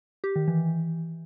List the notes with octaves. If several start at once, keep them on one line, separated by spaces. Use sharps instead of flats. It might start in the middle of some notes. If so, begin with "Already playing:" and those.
G4
D#3
E3